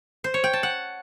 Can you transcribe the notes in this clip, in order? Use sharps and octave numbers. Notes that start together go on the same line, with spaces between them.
C5
C#5
G5
A5
F#5